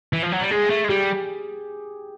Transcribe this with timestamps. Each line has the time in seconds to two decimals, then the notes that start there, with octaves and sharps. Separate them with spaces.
0.13 E3
0.23 F3
0.32 F#3
0.41 G3
0.51 G#3 G#4
0.70 A3
0.84 G#3
0.89 G3 G4